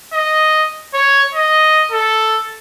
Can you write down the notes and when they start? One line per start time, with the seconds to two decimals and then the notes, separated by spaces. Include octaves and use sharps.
0.13 D#5
0.94 C#5
1.34 D#5
1.92 A4